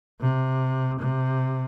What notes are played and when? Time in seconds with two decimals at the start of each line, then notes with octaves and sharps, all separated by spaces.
0.21 C3
0.99 C3